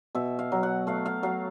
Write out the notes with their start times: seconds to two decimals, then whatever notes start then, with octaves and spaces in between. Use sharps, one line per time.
0.15 B2 E5
0.39 F5
0.52 F#3
0.63 F#5
0.87 A3 F5
1.06 F5
1.23 F#3 F5